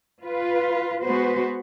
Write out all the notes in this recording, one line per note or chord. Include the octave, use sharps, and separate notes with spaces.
F4 B4
G#3 B3 F#4 B4 C5